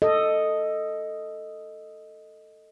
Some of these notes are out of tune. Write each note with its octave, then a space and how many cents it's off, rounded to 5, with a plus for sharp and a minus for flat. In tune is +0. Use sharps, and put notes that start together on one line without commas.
A4 +10 D#5 +0